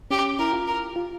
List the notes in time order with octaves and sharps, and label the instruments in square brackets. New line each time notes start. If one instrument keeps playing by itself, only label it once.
[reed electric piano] C#4 [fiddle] G4
[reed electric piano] E4 [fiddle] A#4
[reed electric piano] F4
[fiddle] A#4
[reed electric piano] F4